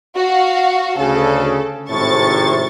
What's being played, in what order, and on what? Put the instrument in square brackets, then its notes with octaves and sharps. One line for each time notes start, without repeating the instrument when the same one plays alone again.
[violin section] F#4 F5
[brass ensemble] D2 C#3 [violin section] A4
[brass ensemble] G#1 A2 C3 [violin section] C#6 A6